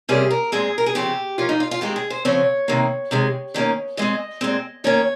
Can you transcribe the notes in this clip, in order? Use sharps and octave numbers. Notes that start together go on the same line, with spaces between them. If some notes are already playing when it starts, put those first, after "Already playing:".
C3 G3 A#3 C#4 G#4
A#4
A#2 G#3 C4 G#4
A#4
G#4
C#3 F3 C4 G4
F3 A#3 C#4 F4
D#4
F4
F4
D#3 G#3 C4 G4
G#4
C5
C#3 F3 C4 C#5
C3 D#3 A#3
C3 D#3 G#3
D#3 G3 A#3 C#4
C#3 G#3 C4 D#5
A#2 G#3 C4
D#3 A#3 C#4 C#5